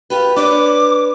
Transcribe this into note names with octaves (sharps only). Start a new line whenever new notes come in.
F4 G4 B4
D4 B4 C#5 D6